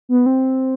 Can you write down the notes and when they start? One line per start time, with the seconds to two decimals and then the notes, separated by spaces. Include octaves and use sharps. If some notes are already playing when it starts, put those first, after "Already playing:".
0.09 B3
0.26 C4